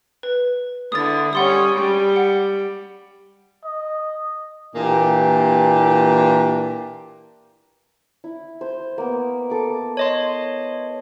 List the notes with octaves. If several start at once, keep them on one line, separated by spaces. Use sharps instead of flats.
B4
D3 E4 D#6 A6
G3 C#4 F#5 C6 D#6
G3
F#5
D#5
A#2 E3 A#3 D4 G4
E4
C5
A#3 B3
A4 D6
C#5 D#5 C6